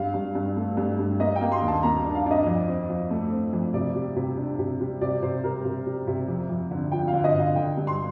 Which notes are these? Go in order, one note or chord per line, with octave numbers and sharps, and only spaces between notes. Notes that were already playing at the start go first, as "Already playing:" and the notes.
Already playing: G2 F5
G2
G2
A3
G2
G2
A#3 D#5
G5
A#3
C6
D#2
A5
A#3 A#5
D4
F5
D4 D#5
F2
C4
F2
A3
C4
F2
C3 D5
G3
C3
D4
C3
G3
C3 D5
C3 C5
G3 A#4
C3
G3
C3
F2
F2
D3
F3 G5
F5
D3
D#5
D3
F5
D3 G5
G2
C6